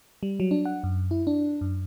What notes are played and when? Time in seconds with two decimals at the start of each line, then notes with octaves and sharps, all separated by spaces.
0.23 G3
0.40 F#3
0.51 D4
0.65 F#5
0.84 F#2
1.11 E4
1.27 D4
1.61 F#2